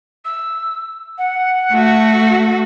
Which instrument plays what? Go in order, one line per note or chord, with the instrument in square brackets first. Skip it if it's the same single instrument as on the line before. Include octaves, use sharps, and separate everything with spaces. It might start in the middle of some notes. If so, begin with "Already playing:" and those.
[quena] E6
F#5
[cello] A3 F#4